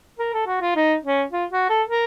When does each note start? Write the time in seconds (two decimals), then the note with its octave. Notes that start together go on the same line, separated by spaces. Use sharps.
0.19 A#4
0.34 A4
0.47 F#4
0.61 F4
0.76 D#4
1.04 C#4
1.32 F4
1.52 F#4
1.70 A4
1.89 A#4